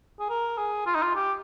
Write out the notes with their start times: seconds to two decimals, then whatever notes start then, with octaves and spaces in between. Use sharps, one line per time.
0.19 G#4
0.29 A#4
0.58 G#4
0.87 F4
0.95 D#4
1.02 F4
1.15 G4